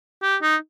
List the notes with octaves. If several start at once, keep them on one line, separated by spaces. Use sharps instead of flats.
G4
D#4